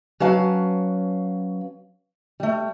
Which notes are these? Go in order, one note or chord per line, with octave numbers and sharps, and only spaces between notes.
F#3 C#4 B4 F5 A5
G3 A3